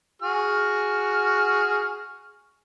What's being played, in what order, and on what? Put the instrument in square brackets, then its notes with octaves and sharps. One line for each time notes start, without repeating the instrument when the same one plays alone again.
[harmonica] F#4 G#4 F6